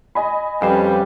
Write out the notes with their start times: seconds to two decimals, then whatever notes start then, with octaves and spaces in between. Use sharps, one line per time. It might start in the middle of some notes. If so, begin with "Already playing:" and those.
0.15 D#5 G#5 B5
0.62 F2 G3 C#4 B4 C5